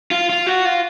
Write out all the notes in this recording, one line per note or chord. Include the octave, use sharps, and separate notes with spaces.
F4
F4
F#4
F4